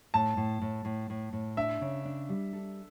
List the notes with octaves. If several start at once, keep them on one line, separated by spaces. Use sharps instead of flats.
A2 A5
A2
A2
A2
A2
A2
D4 E5
C#3
D4
G3
A4